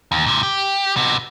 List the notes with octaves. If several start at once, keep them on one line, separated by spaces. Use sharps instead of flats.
D#2
G#2 C3
G4
C3 B3